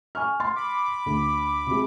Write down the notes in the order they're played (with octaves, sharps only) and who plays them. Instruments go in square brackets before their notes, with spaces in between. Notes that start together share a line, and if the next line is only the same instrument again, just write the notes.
[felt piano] G#5 C#6 F6
C6 A6
[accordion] B5 D6
[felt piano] D2
C3 G#3